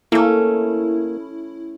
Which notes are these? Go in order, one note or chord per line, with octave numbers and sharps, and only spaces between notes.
A3 A#3 C#4 E4